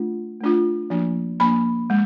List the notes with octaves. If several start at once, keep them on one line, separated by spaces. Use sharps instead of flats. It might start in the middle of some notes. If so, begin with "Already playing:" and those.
Already playing: A3 D4 F4
A3 D4 F4
F3 A#3 D4
F3 A#3 D4 B5
G#3